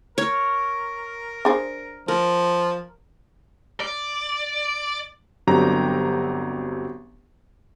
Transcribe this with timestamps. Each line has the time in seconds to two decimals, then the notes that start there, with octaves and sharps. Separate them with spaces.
0.18 A#4 C#5
1.45 D4 G#4 C5
2.08 F3 A#4
3.80 D5
5.47 G1 F#3 C4 D4 G4 A#5